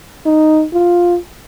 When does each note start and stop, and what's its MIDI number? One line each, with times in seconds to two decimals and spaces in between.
0.26 0.65 63
0.73 1.18 65